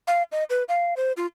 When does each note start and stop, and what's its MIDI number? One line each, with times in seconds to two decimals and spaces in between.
0.07 0.23 77
0.32 0.44 75
0.50 0.63 71
0.69 0.94 77
0.97 1.12 72
1.17 1.26 65